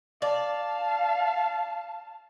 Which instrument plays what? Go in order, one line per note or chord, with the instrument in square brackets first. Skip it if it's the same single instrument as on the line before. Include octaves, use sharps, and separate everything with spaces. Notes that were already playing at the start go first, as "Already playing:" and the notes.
[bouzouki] D5 [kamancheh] F5 A5